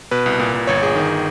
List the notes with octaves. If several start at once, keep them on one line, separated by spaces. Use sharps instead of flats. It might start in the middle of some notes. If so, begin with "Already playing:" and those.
B2 B4
C2
A#2
A#2
G1 C#5
G1 G#4
D#3